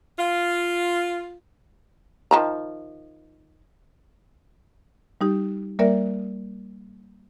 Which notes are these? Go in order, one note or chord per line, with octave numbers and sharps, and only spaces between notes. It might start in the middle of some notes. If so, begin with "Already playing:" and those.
F4
D#3 F3 A#5
G3 D#4 G4
G3 A#3 A#4 D5 E5